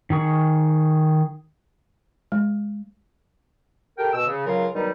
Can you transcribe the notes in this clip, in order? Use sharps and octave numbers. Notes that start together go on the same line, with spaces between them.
D#3 G#4 C#6
G#3
G4 A4 A#4 G5
B2 E6
C#3
C#2 C#3 F#3 F4 A#4 F5
B2 D#3 F#3 G3 D#4